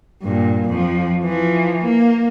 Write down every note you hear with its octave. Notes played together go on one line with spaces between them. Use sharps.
G2 A#2
F2 F3
E3 F3
A#3